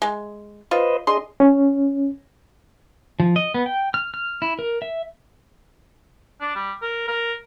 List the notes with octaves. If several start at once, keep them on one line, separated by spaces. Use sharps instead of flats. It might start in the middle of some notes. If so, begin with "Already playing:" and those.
G#3
F4 B4 C5 D#5
D4 G#4 D#5 C6
C#4
F3
D#5
B3
G5
F6
F6
E4
A#4
E5
D4
G3
A#4
A#4